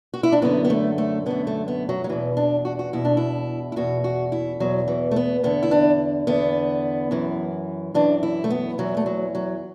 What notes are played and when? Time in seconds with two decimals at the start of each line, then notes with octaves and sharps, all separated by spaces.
0.14 F#4
0.23 E4
0.32 D4
0.42 F#2 D3 B3
0.64 B3
0.70 A3
0.98 A3
1.26 F#2 D3 B3
1.47 A3
1.68 B3
1.89 F#3
2.04 F#3
2.09 E2 B2 E3
2.37 D4
2.65 F#4
2.79 F#4
2.93 E2 B2 E4
3.05 D4
3.17 E4
3.72 E4
3.76 E2 B2 F#4
4.04 F#4
4.32 E4
4.60 E2 B2 F#3
4.88 E3
5.11 A3
5.16 B3
5.43 E2 D3 B3
5.63 E4
5.71 D4
6.27 E2 D3 B3
7.11 F#2 E3
7.94 F#2 E3 D4
8.23 E4
8.44 A3
8.50 B3
8.78 E2 E3 F#3
8.97 A3
9.06 F#3
9.35 F#3